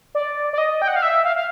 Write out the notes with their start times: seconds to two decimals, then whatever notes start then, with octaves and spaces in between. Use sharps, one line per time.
0.15 D5
0.53 D5
0.58 D#5
0.82 G5
0.88 F#5
0.96 F5
1.02 E5
1.25 F5
1.36 F5